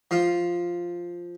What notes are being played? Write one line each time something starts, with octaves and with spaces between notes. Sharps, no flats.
F3 F4